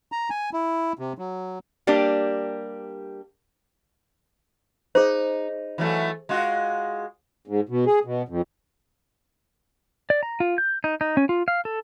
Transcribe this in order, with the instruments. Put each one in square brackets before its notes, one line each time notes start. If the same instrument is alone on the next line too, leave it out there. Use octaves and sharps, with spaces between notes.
[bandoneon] A#5
G#5
E4
C3
F#3
[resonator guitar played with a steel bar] G3 A#3 D4 G4
[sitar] D#4 [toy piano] G#4 C5
[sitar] E3 F#3 A3
G#3 F4 F#4
[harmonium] G#2
B2
G#4
B2
F2
[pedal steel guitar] D5
A#5
F4
G6
D#4
D#4
C#4
F4
F5
A4